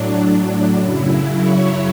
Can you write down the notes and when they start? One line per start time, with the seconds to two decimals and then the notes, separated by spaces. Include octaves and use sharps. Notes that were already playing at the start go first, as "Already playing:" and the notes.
Already playing: A2 F#3 D4
0.10 D4
0.77 F#2 C#3 F#3 E4
1.44 C#5